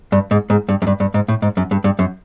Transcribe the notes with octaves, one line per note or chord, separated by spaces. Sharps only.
G2
G#2
G#2
G2
F#2
G2
G2
G#2
A2
G#2
F#2
G2
G2
F#2